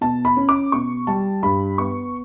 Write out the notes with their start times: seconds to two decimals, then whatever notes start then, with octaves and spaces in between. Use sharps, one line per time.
0.01 B2 A5
0.25 B5
0.37 C#4
0.49 D6
0.72 B2 C#6
1.07 G3 A5
1.43 G2 B5
1.78 B3 C#6